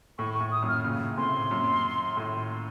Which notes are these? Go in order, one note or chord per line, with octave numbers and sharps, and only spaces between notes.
A2 C#6
C#6
A2
D#6
F#2 A#2
F6
A#2 C#3
A2 C3 C6
F#2 A#2
A2